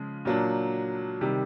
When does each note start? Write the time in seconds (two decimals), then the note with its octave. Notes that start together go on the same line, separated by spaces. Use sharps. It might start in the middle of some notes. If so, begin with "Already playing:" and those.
Already playing: C#3 F3 G#3
0.25 A#2 F#3 A#3 D4
1.21 C3 D#3 G3